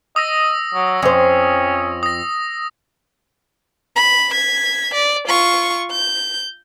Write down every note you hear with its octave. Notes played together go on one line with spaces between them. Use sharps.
D#5 D#6 E6 A#6
F#3
F2 C#4 C5
D#6 A#6
B5
G#6 B6
D5
F4 C#6
G6